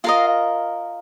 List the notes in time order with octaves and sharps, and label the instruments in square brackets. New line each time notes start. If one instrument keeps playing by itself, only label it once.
[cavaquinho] F4 A#4 D#5 F5